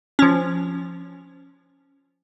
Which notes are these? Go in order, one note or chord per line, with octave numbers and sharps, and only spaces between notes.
F3 C#4